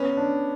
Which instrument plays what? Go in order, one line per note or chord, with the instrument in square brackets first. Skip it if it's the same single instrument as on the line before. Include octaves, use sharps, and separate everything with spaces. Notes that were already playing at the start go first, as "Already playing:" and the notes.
Already playing: [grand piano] B3 [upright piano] C#4
[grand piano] D4